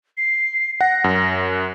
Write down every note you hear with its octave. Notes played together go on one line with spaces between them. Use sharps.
C7
F#5 A#6
F#2
F#6